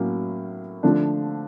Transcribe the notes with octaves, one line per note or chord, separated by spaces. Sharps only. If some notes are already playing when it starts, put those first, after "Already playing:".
Already playing: A2 F#3 A#3 C#4
D3 F3 A3 D4